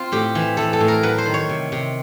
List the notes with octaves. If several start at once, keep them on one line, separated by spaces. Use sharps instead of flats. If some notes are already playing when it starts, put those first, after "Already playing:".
Already playing: C4 F4
A2 G4
E3
E3 A4
A4
A2
A#4
F#3 B4
C5
D#3
C#5
C3
C3